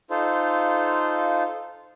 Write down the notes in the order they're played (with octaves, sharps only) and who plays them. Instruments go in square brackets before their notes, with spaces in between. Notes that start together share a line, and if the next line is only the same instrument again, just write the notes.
[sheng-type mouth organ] D#4 F4 A4 C5